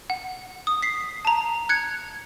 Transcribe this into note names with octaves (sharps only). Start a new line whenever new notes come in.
F#5
D#6
B6 C7
A5 A#5
F#6 G#6 C#7